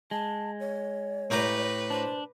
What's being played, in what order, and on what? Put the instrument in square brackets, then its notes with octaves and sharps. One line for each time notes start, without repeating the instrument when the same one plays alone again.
[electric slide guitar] G#3 [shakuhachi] A5
[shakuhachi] C#5
[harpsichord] A2 G4 A#5 [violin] B4
[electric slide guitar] D4 [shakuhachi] C5